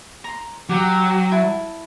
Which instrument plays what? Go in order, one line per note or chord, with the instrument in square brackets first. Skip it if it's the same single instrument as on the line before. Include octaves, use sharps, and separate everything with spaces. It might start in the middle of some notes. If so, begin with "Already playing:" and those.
[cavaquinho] A#5 C6
[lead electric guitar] F#3 [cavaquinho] G4
[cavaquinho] E4 A5